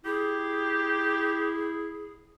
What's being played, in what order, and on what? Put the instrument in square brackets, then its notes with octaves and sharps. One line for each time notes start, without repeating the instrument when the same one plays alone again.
[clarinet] E4 [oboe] G4 [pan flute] G#4